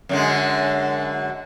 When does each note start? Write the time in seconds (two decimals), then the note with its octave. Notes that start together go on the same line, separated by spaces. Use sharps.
0.09 F#2 D3 G#3